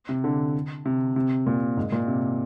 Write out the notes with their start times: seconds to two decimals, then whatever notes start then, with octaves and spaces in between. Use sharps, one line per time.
0.09 C3
0.24 D3
0.85 C3
1.16 C3
1.46 A#2
1.77 G#2
1.92 A#2
2.08 C3